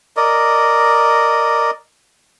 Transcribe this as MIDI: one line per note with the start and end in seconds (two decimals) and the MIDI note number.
0.17 1.71 70
0.17 1.71 74
0.17 1.71 75